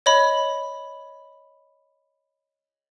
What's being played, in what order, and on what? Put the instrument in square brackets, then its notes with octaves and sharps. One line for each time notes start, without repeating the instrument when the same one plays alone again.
[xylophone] C#5 D#5 B5